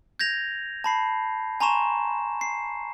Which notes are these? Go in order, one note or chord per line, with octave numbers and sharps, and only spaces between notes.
G6 G#6 A#6 F7
A5 B5 C7
G#5 A#5 C6 C#6 E7
C7